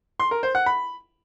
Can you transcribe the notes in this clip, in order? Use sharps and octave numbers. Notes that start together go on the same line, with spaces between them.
C6
A#4
C5
F#5
B5